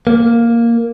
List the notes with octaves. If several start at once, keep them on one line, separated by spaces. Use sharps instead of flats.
A#3